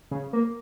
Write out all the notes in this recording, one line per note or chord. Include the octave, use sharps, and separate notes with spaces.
C#3
A#3